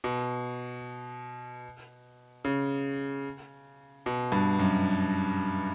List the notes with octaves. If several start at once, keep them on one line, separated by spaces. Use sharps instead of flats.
B2
C#3
B2
G2
F#2